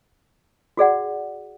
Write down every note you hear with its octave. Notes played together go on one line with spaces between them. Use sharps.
F#4 G#4 D5 F#5